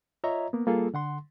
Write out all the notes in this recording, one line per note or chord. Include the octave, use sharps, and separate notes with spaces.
F4 C#5 D#5 E5 A#5
A#3 B3
G3 A#3 F4 G#4 A4
D3 F#5 C6